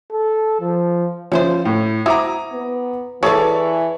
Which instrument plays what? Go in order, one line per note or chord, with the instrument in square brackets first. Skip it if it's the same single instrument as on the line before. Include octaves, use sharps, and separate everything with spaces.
[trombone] A4
F3
[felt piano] F3 [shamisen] C#4 E4 C5
[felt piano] A2
[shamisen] C4 E4 F#4 [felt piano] A#5 D6 D#6
[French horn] B3
[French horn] E3 [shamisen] G#4 B4 D5 [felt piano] A4 C#5 C#6